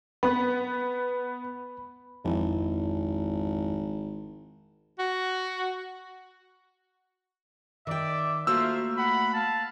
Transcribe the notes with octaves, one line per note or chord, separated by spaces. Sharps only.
B3 B5
G#1 F2 F3 E4
F#4
D#3 D5 E5 G5 D6
A3 A#3 F4 F#4 C5 E5 E6
F#5 B5
F5 A5